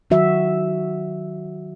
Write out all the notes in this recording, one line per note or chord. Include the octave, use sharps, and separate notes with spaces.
D#3 F#3 F#4 E5